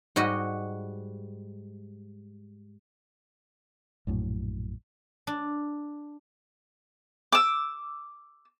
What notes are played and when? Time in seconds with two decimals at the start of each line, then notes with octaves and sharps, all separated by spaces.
0.16 G#2 G3 F#4 D#5
4.07 A#1 F#2 A2
5.27 D4
7.32 D6 E6